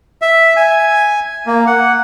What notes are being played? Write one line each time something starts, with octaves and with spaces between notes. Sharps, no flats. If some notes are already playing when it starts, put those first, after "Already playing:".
E5
G#5
A#3
F#5